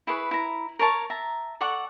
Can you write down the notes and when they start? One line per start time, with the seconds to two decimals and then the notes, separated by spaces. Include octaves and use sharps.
0.07 E4 G#4 B4 C#6
0.31 E4 A#5
0.79 A#4 C#5 A5 C#6
1.10 E5 A5 A#5
1.61 A4 D5 F#5 C#6